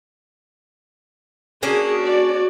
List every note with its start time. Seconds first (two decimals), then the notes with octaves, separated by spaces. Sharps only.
1.63 A#3 C#4 D4 F#4 G#4
2.00 F#4 C#5 D5